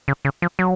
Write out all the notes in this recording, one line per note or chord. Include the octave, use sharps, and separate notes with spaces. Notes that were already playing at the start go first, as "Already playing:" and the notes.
C#3
C#3
F3
F#3